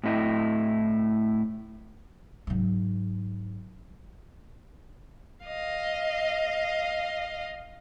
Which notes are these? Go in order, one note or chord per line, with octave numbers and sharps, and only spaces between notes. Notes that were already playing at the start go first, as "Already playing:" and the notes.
A2 C4 E4 D#5
G#2 F#3
D#5 F5